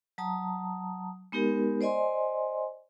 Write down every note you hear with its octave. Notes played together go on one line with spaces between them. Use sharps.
F#3 A5 A#5 D#6
G#3 B3 D#4 G4 A#4
C5 D5 D#5 G#5 C6